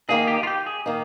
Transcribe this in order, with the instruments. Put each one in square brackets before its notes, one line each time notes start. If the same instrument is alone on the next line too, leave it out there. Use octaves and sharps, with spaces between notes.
[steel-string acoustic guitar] D#3 A#3 D#4 [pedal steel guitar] G#4
[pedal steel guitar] G4
F4
G4
G#4
[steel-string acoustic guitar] D#3 A#3 D#4